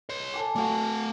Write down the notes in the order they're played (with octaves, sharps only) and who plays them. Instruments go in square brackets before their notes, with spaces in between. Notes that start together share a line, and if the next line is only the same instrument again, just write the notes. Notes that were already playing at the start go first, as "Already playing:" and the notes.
[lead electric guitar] C#5 C6
[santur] A4 G#5 D6
[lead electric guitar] A3 F5 [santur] F#4 D5